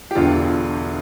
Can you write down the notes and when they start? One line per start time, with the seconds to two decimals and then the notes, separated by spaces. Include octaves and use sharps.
0.11 G4
0.15 E1 E2 D3 F4